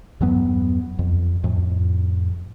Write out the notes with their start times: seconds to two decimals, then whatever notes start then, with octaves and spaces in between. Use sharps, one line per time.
0.20 E2 G2 F#3 B3
0.99 F2
1.44 F2 A2